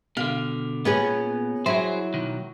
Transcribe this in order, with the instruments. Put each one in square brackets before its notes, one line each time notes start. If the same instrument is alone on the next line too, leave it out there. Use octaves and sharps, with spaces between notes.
[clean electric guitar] B2 D3 [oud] F5
[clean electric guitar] A#2 [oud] B3 C#4 G#4
[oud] F#3 E4 [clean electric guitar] F#4 G#4 C5
[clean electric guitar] B1 D#3